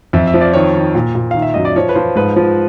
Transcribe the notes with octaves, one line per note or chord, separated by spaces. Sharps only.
F2 E5
E5
F3
D5
D#3 C#5
D#3
A#2
A#2
D#3 F5
E5
F#2 D#5
D5
F3 C#5
B4
F3 C5
G#2 B4
F3